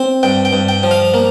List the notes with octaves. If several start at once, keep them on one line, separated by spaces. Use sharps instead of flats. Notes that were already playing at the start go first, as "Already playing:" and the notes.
Already playing: C4
G2 G5
G5
G2
G5
F3
F5
A#3